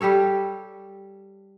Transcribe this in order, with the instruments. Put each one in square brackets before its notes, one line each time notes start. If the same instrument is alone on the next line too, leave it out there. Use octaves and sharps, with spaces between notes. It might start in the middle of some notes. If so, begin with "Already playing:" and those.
[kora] G3 G4 A4 C#5